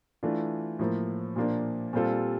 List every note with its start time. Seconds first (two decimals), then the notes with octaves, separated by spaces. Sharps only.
0.23 E3 A3 D4 F4
0.79 A2 F3 A#3
1.36 A#2 F3 A#3 D4
1.93 A#2 G3 C4 F4 A4